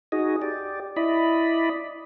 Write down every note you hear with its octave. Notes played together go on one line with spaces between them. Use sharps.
D#4 F#4 G#4 D#5
G4 D5
E4 D5 D#5 B5